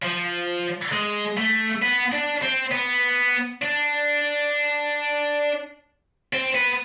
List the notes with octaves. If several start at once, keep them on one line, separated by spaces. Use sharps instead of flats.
F3
G#3
A3
B3
D4
C4
B3
D4
C4
B3